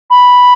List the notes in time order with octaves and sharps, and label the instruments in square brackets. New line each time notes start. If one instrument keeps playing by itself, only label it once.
[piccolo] B5